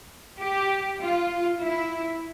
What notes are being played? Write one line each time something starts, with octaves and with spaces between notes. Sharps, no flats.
G4
F4
E4